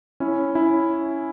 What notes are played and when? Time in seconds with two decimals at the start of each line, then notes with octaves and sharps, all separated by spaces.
0.20 C#4 E4
0.55 C#4 E4